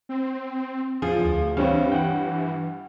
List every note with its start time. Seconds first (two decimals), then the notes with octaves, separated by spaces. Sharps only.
0.09 C4
1.02 E2 F3 G#4
1.24 D2
1.57 G2 E3 C4 C#5 F5
1.92 F#5 G5